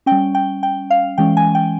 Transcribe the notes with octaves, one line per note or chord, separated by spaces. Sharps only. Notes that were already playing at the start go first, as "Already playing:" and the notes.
C#4 G5
G3
G5
G5
F5
E3 G#3 C#4 G5
G#5
G5